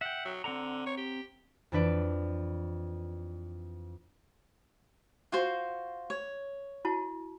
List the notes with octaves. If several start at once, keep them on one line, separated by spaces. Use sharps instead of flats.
E5 F#5 G5
F#3
D3 C4 F#5 A#5
C#5
G4
F2 E3 D4 B4 D5 D7
F4 F#4 C5
C#5
E4 F#4 A5